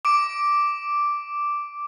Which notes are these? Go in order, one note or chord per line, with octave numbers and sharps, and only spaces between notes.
D6 D7